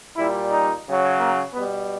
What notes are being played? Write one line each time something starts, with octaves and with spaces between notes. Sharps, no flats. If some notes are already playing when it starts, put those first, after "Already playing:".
A#2 G3 E4
D#4
C#3 F#3
A#3
B2 G3 B3